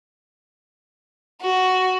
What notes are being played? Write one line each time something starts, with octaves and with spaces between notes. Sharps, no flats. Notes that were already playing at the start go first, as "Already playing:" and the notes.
F#4